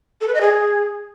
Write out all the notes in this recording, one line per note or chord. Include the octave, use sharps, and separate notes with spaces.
A4
B4
D#5
G#4